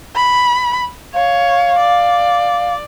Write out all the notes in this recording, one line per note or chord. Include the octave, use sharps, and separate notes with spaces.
B5
C#5 F5
D5